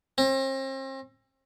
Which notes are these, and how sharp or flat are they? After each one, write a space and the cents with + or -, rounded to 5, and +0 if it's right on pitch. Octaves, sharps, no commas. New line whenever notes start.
C4 +40